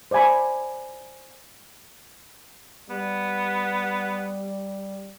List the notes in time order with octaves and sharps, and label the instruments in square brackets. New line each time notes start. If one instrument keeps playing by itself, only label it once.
[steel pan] C5 D5 E5 G#5 B5
[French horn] G3 [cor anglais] B3